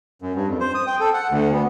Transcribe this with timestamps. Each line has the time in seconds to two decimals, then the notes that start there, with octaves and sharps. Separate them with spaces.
0.22 F#2
0.35 G2
0.48 F2
0.60 C5
0.75 D#6
0.87 G5
1.00 A4
1.14 F#5
1.30 D2
1.52 B3